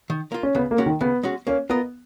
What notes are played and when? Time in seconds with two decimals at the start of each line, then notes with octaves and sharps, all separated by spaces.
0.10 D#3
0.32 A#3 F4
0.43 C#4
0.55 C#3 B3
0.71 A#3
0.78 G#3 C#4 F#4
0.86 D#3
1.01 C#3 B3
1.23 G#3 C#4 F#4
1.47 A#3 C#4
1.70 B3 F4 A#4 D#5